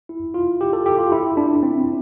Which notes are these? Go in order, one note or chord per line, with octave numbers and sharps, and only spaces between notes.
E4
F4
G4
A4
G4
F4
E4
D4
C4